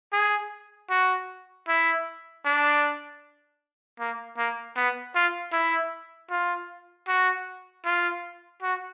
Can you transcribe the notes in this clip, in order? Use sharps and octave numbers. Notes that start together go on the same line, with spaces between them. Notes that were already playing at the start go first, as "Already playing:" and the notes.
G#4
F#4
E4
D4
A#3
A#3
B3
F4
E4
F4
F#4
F4
F#4